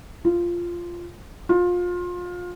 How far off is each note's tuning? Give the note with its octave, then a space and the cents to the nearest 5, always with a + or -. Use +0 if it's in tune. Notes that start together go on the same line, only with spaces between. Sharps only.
F4 -10
F4 +25